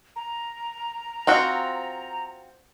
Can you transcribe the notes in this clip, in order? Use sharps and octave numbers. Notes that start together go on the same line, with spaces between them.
A#5
C4 F4 F#4